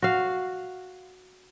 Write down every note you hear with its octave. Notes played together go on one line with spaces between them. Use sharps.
F#4 F5